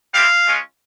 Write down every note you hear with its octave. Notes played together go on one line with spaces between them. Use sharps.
G3 C4 E4 G4 F5
G#3 C#4 F4